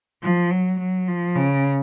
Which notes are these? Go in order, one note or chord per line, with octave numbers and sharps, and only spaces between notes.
F3
F#3
F#3
F3
C#3